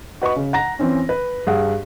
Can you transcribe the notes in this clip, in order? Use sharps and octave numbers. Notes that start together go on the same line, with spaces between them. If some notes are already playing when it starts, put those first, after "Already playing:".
F#4 B4 D#5 C#6
C#3
F#5 A#5 A#6
E3 C4 C#4
B4
G2 G#4 F#5